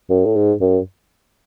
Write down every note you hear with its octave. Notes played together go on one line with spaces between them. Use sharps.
F#2
A2
G#2
F#2